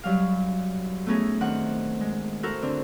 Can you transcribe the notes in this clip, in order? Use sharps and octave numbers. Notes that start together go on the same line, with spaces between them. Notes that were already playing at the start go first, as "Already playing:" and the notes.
F#2 F#3 G3 F5
A3 B3 C#4 D#4 E4 G#4
D#3 C4 D4 F#5
G#3
E4 F#4 A4 A#4 C5
D3 C4 D4